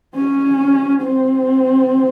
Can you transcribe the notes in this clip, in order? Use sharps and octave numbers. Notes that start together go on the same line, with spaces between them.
C#4
C4